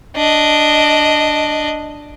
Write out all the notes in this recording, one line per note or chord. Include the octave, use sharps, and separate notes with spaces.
D4 D#5